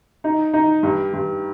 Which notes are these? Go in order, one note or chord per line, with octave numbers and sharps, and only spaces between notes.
D#4
D#4
G2
G2